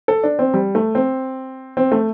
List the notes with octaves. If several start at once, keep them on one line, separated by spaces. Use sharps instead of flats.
A4
D4
C4
G3
A3
C4
C4
A3